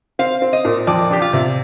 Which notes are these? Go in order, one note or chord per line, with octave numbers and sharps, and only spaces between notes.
C4 F5
C4
D#5
A#2
F2 D5
D4 G4
F4
C3